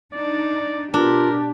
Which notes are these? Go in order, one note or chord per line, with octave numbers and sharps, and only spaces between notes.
D4 D#4 D5
B2 D4 F4 G4 A#4